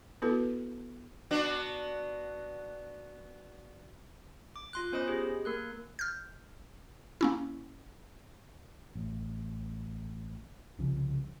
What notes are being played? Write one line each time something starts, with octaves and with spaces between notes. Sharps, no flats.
B3 E4 F#4 A4 B4
B3 D4 F#4
D6
F4 C6 F#6
B3 C#4 C5 D#5 B5 D#6
G4 G#4
A#3 A#4 F#6
F6 G6
A#3 C#4 E4
A1
C2 C#3 F3